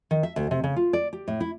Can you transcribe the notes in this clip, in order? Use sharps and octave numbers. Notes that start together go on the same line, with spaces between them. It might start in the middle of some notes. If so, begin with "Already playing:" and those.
D#3
E5
D2
C3
C#3
F4
D5
G4
A2
E4